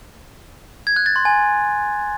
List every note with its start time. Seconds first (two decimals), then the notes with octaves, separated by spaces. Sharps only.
0.87 G#6
0.96 F#6
1.06 A6
1.16 C6
1.25 G#5